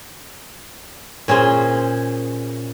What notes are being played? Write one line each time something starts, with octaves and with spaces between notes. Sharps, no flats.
A#2 C#4 G#4 C5